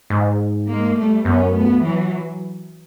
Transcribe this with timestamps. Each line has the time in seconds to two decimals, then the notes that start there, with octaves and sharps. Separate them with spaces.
0.10 G#2
0.68 G#3 A#3
0.97 G3 A3
1.25 F#2 B3 C#4
1.53 A3 B3
1.83 E3 F#3